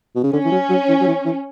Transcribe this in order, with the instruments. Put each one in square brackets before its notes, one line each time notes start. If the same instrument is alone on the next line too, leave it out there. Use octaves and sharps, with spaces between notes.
[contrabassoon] B2
C#3
[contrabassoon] D3 [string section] C#4
[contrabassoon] E3
F#3
F#3
E3
F#3
E3
E3